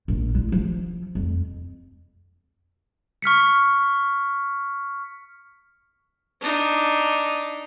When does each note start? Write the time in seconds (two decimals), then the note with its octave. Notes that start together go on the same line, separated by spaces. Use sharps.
0.08 A#1
0.35 E4
0.52 F3
1.15 F2
3.22 C#6 F6 B6 C#7
6.41 D4 D#4